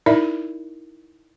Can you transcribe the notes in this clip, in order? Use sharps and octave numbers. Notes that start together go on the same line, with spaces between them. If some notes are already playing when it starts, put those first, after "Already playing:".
D#4 E4 A#4 D5 E5